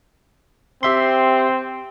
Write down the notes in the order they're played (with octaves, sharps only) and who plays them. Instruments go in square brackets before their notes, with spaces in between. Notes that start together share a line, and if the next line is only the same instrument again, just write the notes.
[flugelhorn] C4 [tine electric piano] G4 E5 C6